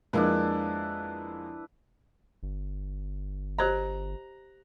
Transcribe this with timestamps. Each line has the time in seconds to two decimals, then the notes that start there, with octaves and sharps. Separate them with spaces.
0.13 F2 G#3 A#3 D4 E4 B4
2.43 G1
3.59 G4 C5 D#5 A#5 F#6